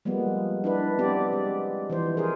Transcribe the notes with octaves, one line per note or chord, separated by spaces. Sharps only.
F3 G3 G#3 A#3 B3
D4 E4 B4
B3 C4 G4 D5
G#3
E3 F3 C5
G#4 A#4 C5